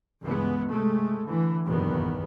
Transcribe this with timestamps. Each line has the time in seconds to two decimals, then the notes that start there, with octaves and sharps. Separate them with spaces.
0.22 C#2 G2 E3 G#3 B3
0.69 C3 G#3 A3
1.25 D3 E3
1.65 F#1 B1 E2 G2 D#3 B3